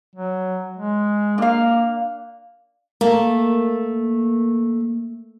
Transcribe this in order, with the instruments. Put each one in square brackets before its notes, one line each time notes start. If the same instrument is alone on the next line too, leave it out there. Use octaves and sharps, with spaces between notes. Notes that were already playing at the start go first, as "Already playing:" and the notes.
[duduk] F#3
G#3
[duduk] A#3 [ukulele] D4 F5
[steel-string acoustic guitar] A3 [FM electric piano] A#3